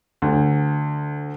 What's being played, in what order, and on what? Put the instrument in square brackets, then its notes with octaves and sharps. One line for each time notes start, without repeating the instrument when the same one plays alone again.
[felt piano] D2